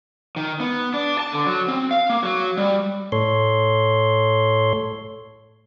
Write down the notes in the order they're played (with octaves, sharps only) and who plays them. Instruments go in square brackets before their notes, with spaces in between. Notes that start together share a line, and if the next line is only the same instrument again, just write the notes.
[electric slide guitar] D#3
B3
D4
A5
D3
F#3
C4
F5
A#3
F#3
G3
[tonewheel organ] A2 A4 C#5 C6